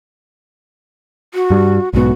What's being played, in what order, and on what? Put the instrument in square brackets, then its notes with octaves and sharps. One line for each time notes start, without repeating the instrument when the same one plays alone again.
[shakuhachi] F#4
[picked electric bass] G2 G3
[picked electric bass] B1 G#2 B3 [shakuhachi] F#4